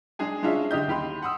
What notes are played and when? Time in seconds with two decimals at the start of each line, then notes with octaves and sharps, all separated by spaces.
0.19 G#3 D4 G#4 G#5
0.43 G#3 C#4 D4 F4 E5
0.71 D3 G4 D#5 G6
0.88 D#2 G4 B5 C6
1.22 F#5 C6 D#6 E6